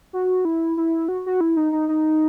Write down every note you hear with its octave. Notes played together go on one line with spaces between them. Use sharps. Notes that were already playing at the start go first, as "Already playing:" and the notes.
F#4
E4
E4
F#4
F#4
E4
D#4
D#4
D#4